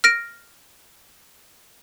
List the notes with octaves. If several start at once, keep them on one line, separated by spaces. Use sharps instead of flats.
F6 A#6 D7